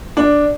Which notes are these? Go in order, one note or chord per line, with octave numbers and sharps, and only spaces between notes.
D4